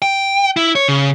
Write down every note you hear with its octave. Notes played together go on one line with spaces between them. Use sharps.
G5
E4
C#5
C#3